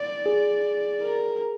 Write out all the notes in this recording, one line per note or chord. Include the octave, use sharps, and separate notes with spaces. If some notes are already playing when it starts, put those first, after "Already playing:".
Already playing: D5
G#4
A#4